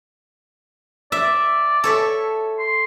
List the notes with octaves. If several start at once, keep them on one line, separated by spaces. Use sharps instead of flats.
D5 E5
A4 C#5 E5
C6